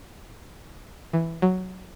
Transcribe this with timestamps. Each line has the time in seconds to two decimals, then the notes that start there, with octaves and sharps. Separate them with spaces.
1.13 E3
1.42 F#3